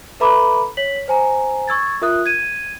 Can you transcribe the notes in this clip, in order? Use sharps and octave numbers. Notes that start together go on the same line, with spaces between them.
A4 B4 E5 A#5 B5 D6
C#5 B6 F#7
C5 G#5 A#5
C#6 E6 G#6 A6
F4 A#4 E5 D#6 F#6
G#6 D#7